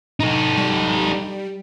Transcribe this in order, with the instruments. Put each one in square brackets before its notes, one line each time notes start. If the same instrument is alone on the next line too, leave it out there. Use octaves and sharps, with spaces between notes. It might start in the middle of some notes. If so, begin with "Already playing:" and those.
[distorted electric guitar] D#4 A4
[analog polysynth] G3